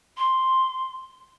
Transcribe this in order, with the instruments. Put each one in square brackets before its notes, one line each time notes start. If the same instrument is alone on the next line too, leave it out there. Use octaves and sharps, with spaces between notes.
[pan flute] C6